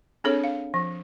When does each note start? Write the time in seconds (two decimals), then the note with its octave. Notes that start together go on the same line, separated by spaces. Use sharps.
0.24 C4 D4 G#4 A4 C#5
0.44 F5
0.74 F3